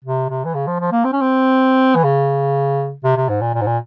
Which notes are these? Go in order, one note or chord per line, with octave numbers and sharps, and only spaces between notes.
C3
C3
E3
C#3
F3
F3
A#3
C4
C#4
C4
E3
C#3
C3
C3
G#2
A#2
A#2
G#2
A#2